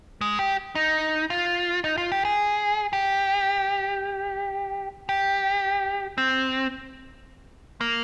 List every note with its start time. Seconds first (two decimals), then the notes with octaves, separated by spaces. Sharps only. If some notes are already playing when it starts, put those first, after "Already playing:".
0.21 G#3
0.39 G4
0.75 D#4
1.30 F4
1.84 D#4
1.98 F4
2.12 G4
2.25 G#4
2.93 G4
5.09 G4
6.18 C4
7.81 A#3